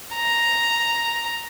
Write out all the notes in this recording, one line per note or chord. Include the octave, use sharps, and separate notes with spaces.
A#5